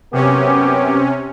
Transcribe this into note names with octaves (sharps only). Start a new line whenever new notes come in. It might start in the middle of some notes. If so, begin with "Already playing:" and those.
F#2 C3 B3 C#4 G4